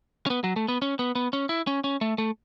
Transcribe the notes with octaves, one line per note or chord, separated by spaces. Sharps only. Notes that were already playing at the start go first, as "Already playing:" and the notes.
C#4
B3
F#3
A3
B3
C#4
B3
B3
C#4
E4
C#4
C#4
A3
A3